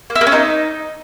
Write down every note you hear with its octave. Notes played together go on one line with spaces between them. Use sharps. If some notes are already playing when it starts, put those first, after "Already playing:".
A#3
E4
A#3
C#4
D#4